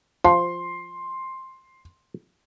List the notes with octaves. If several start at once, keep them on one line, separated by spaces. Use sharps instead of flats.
F3 C6